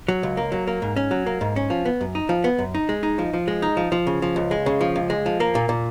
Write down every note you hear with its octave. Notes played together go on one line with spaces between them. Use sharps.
F#3
C#2
A#3
F#3
A#3
G#2
C#4
F#3
A#3
G#2
C#4
F3
B3
F#2
D#4
F3
B3
F#2
D#4
G#3
D#4
F3
F3
G#3
D#4
F3
F3
C#3
F3
C#2
G#3
C#3
F3
C#2
G#3
F3
A#3
A#2
A#2